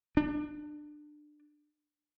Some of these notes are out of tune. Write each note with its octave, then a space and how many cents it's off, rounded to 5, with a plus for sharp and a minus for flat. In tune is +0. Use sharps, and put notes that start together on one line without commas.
D4 +25